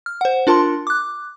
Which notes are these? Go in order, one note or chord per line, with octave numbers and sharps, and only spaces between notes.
F6
C5 F#5
D4 F4 A#4 A5 C6
D6 F#6